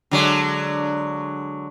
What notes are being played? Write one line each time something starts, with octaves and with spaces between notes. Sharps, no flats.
D3 F#3 G#3